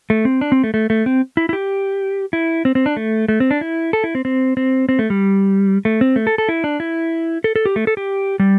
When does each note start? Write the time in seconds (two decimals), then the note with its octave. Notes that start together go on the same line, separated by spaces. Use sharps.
0.10 A3
0.25 C4
0.41 D4
0.52 C4
0.64 A3
0.74 A3
0.90 A3
1.06 C4
1.37 E4
1.49 E4
1.53 G4
2.33 E4
2.65 C4
2.75 C4
2.86 D4
2.97 A3
3.28 A3
3.40 C4
3.51 D4
3.61 E4
3.93 A4
4.04 E4
4.15 C4
4.25 C4
4.57 C4
4.89 C4
4.99 A3
5.10 G3
5.85 A3
6.01 C4
6.16 A3
6.27 A4
6.38 A4
6.49 E4
6.64 D4
6.80 E4
7.44 A4
7.56 A4
7.66 G4
7.76 A3
7.87 A4
7.97 G4
8.40 G3